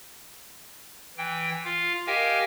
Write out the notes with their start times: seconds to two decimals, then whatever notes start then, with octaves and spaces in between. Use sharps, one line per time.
1.18 E3 G5
1.65 F4 F5
2.07 G4 A#4 D#5 F5 G5 G#5